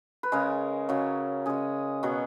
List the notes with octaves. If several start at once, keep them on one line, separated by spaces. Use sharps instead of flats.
B4
C#3 G#3 A#4
C#3 F#3
C#3 G#3 G#4
B2 F#3